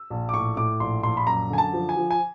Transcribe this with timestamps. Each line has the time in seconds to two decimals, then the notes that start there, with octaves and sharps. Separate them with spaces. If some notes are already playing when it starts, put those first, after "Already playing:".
Already playing: E6
0.10 A#1
0.29 D6
0.33 A2 C#6
0.57 A2 D6
0.80 A#1 C6
1.03 A#1 C6
1.17 B5
1.27 F#2 A#5
1.50 D3 G#5
1.58 A5
1.73 F3
1.89 G#5
1.97 F3
2.11 G#5